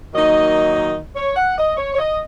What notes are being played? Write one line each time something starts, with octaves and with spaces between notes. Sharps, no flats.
D#3 F#3 A#3 D#4 D#5
D#5
C#5
F#5
D#5
C#5
C#5
D#5